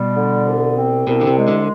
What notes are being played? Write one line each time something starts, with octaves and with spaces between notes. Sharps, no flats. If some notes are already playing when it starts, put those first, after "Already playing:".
Already playing: B2 G3
D3
C2
C4
C2 B2
D3
C3
G#3
D3